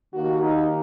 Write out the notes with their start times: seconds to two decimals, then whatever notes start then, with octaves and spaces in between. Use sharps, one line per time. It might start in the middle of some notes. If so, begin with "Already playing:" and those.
0.13 D#2 D#3 A#3 F#4
0.42 D#4